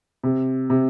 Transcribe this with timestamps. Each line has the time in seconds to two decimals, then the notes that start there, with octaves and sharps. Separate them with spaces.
0.23 C3
0.70 C3